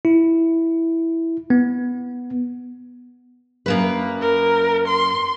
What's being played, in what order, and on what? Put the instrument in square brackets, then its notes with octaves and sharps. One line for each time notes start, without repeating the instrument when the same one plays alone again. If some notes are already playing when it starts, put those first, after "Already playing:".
[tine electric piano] E4
B3
[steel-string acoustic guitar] F#2 A#3 B4
[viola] A#4
C6